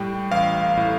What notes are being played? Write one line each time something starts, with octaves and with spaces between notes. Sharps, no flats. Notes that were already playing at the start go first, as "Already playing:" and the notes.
Already playing: A2 G3 G5
A1 F5
A2